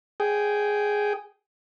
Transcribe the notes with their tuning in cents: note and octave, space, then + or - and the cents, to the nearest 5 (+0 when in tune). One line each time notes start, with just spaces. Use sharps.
G#4 +0 G5 -10